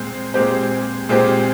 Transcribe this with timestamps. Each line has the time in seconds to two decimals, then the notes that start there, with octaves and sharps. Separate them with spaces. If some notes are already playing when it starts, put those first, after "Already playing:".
Already playing: A#2 G#3 C4 C5
0.34 A#2 G#3 C4 G4 C5
1.09 A#2 G#3 C4 G4 C5